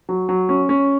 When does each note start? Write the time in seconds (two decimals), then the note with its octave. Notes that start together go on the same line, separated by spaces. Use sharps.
0.09 F#3
0.29 F#3
0.49 C#4
0.69 C#4